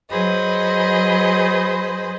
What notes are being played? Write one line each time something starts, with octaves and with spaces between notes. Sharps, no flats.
F#3 G#4 B4 C5 D#5 B5